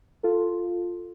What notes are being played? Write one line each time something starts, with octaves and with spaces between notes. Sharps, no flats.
F4 A4